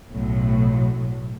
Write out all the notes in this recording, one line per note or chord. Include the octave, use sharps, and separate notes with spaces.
B1 A2 F#3